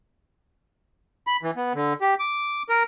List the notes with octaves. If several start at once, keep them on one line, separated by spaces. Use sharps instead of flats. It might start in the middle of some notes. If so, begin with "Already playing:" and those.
B5
E3
B3
D3
G4
D6
A#4